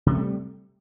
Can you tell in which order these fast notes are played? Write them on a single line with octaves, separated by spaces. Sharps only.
C3 A#3 A3 G3